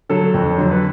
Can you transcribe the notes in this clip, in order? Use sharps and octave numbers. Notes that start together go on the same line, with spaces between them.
D3 F#3 A4
F2
D3 F#3
B4